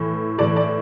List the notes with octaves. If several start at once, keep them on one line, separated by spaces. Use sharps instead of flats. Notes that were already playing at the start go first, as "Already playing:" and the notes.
Already playing: A2 E3
A2 E3 D5
D5